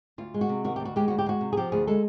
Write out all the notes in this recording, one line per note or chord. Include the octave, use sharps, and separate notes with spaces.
D2 F4
G#3
F#4
C3
D#3 F#4
D2 G4
F#4
G#3 G4
D2 F#4
G4
G#3 F#4
C3
G#4
F3 G4
D2 G#4
G#3 A4